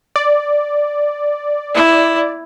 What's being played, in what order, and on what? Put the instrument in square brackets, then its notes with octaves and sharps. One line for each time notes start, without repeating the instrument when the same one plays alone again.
[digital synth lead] D5
[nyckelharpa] E4